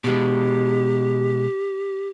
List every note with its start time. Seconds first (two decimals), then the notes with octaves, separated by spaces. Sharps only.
0.04 B2 G#3 G4